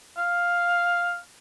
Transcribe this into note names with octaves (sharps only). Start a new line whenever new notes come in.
F5